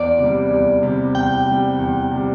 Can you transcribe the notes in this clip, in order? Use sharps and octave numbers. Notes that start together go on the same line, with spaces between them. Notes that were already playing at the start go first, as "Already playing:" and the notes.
Already playing: E2 D5
C3 G3
E2
C3 G3
E2 G5
C3 G3
E2
C3 G3